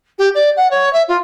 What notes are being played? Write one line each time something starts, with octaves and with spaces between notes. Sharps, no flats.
G4
D5
F#5
C#5
E5
F4